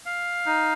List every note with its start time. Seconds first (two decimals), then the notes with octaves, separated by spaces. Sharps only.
0.06 F5
0.46 D#4